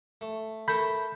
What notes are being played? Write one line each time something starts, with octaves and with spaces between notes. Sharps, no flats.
A3
A3 A4 A#4 B5 G6